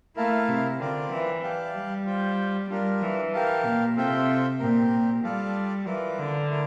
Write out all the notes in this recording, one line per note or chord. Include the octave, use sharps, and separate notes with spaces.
A3 E4 A#4 F5 A5
C3
D3 C4 F4 A#4 D5
E3
G4 D5 F5 A5
G3
F4 C5 G5
G3 D4 F4 A#4
E3
G4 A#4 F5 A5
A#2
C3 C4 F4 A4 E5 G5
A#2 C4 G4 A#4
A#2
G3 F4 A4 D5 F5 A5
E3 F4 A#4 D5
D3
A3 E4 A#4